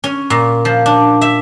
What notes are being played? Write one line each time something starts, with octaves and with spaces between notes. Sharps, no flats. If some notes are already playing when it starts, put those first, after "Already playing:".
C#4
A#2
F3
D4
E5